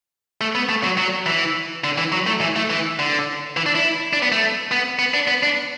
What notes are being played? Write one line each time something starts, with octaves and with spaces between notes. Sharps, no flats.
A3
B3
A3
F#3
F#3
E3
D3
E3
F#3
A3
E3
A3
E3
D3
E3
D4
E4
D4
B3
A3
B3
B3
D4
B3
D4